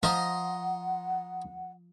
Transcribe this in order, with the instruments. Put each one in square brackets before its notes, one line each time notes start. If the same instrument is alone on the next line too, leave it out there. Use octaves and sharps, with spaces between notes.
[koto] F3 [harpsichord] D#5 A#5 C6 [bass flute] F#5